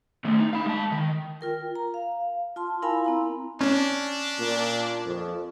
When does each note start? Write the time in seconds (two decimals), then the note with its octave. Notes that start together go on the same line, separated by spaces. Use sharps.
0.25 D#3 A3
0.40 D#4
0.53 F5 B5
0.66 G#3 A5
0.92 D#3
1.41 F4 A#4 G5
1.76 A#5
1.94 F5
2.56 F4 A5 C6
2.82 E4 A#4 F5 G#5 B5
3.04 C4 E4 A#5
3.61 C#4 D4
4.39 A#2
5.05 F2